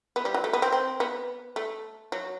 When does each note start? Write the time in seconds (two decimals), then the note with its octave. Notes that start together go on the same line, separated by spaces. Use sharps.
0.16 B3
0.25 G3
0.34 F#3
0.44 A3
0.53 B3
0.62 C4
0.72 C4
1.00 B3
1.56 A3
2.12 F#3